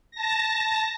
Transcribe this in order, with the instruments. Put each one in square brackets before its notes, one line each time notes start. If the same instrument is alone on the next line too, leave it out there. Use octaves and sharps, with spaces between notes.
[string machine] A5 A#6